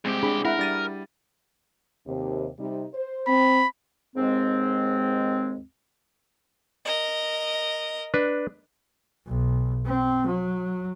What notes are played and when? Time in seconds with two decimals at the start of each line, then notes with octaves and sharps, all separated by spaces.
0.05 C2 G#3 C4 G4
0.23 D4 G#4 B5
0.45 E4 A#4 F#5 B5
0.59 G3 D4 A6 D#7
2.07 D#2 C3
2.59 C3 G3 D#4
2.94 C5
3.27 C4 B5
4.16 D#2 G#2 G#3 C4
6.85 A#4 D#5
8.14 D4 B4
9.27 B1
9.86 C4
10.27 F#3